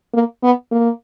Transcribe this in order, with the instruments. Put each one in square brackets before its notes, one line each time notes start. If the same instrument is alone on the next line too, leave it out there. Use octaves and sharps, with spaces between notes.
[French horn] A#3
B3
A#3